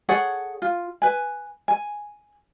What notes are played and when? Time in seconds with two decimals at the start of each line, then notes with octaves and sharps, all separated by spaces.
0.09 G#4 A4 C#5 F#5
0.62 F4
1.02 B4 G#5
1.68 G#5